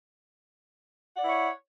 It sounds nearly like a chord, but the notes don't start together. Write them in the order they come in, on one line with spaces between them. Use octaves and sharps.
F#5 D5 E4 C#5